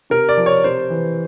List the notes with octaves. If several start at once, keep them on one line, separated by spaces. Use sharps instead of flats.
C3 A#4
D5
F3
C#5
C3 C5
E3